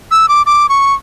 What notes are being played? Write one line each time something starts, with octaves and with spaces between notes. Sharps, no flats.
E6
D6
D6
C#6